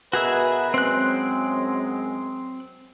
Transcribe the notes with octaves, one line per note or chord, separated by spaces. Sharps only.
B2 F#4 G#4 A#4 B4 E5
F#2 G#3 C4 F#6